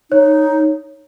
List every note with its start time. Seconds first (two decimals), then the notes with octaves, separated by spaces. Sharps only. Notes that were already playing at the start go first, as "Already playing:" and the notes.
0.11 D#4 C#5